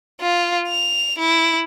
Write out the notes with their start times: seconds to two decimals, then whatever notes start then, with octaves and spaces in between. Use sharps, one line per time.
0.21 F4
0.68 F7
1.18 E4